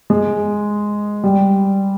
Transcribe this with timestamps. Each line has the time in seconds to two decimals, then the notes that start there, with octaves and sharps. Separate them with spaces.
0.10 G#3
1.24 G3